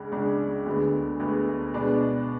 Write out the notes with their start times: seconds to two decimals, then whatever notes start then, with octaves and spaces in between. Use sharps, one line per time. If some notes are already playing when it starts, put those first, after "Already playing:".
Already playing: C#2 C#3 G#3 D4
0.12 C#2 C#3 G#3 D4
0.66 D2 D3 G#3 B3
1.20 D2 D3 G#3 B3
1.74 B2 G#3 B3 D4